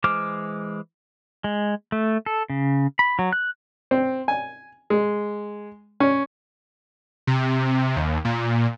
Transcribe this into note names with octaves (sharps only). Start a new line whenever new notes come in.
E3 G#3 C5 D6 F6
G#3
A3
A4
C#3
B5
F#3
F#6
C4
G#5
G#3
C#4
C3
D#2
A#2